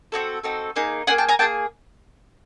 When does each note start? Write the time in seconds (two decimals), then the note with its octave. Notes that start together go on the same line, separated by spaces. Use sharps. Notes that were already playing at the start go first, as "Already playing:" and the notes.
0.12 C4 D#4 F#4 A4
0.44 C4 D#4 F#4 A4
0.76 A#3 D#4 G#4
1.07 A#3 D#4 G#4 F#5 G#5
1.18 G5 A5
1.29 G#5 A#5
1.39 A#3 D#4 G#4 G5 A5